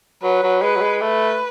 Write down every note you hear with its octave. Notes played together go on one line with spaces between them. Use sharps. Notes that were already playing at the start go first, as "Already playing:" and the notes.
F#3 B4
F#3
G#3 B4
F#3
G#3
A3 B4